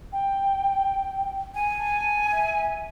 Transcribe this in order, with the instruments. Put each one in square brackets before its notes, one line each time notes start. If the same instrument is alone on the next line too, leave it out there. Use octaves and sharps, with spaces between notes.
[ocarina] G5
[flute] G#5
[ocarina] A5
E5